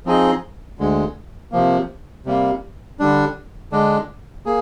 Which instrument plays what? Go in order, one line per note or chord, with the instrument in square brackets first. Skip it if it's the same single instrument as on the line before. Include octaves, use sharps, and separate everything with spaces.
[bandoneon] F3 C4 D#4 G#4 D#5
D2 D3 G#3
C3 F3 A#3
C3 G3 A#3
D3 G3 D4
D3 G#3 D4
A#3 G#4